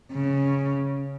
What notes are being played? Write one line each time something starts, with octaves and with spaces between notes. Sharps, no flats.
C#3